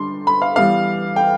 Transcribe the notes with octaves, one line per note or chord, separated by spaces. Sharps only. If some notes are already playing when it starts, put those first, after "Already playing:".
Already playing: D3 G3 D4 C6
B5
F5
E3 G3 B3 F5
G5